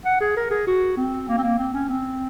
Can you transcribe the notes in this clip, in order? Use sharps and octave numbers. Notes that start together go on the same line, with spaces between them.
F#5
G#4
A#4
G#4
F#4
C4
A#3
C4
A#3
C4
C#4
C4